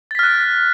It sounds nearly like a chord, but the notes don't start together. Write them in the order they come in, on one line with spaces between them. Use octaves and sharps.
A6 B6 F6 F#6